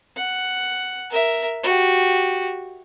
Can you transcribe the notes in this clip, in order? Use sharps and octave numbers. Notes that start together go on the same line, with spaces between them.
F#5
A#4 E5
F#4 G4